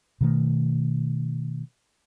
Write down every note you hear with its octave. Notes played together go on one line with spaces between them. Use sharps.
B2 D#3 A3